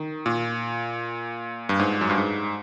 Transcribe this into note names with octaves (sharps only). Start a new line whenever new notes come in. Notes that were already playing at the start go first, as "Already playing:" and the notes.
Already playing: D#3
A#2
G2
G#2
F#2
G2
G#2